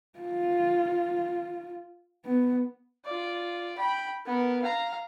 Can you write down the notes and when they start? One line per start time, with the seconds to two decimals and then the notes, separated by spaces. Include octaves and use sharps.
0.19 F4
2.26 B3
3.05 F4 D5
3.78 G5 B5
4.27 B3 A#4
4.62 F5 A#5